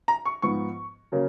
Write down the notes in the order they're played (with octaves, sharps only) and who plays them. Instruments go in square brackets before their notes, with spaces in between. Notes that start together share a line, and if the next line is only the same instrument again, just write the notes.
[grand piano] A#5
C#6
G#2 F3 B3 C#6
C#3 F#3 A#3 C#4